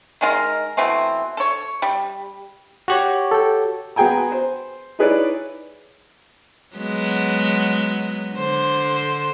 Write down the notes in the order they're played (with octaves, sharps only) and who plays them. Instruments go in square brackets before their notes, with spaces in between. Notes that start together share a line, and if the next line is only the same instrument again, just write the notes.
[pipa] D#3 G#3 F4 A#4
B2 E3 A3 C4
A4 C#5
G3
[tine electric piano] F#4 G4 C#5
[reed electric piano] A4 G5
[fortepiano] B3 F#4 G#4 G5 G#5 A#5
C5
D#4 E4 G#4 B4 C#5 D5
[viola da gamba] F#3 G#3 B3
D3 C5